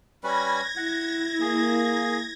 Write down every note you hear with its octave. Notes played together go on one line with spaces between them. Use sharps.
G3 C#4 B4 G#6 A#6
E4 F#5
A#3 G#4